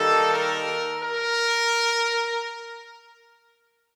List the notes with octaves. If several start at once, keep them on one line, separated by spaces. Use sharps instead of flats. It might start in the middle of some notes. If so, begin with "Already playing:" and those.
Already playing: D#3 G3 A#3 D#4 A4
A#4
A#4